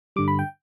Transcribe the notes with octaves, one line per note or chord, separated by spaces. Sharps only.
G2 D3 G3 D6
B5
G5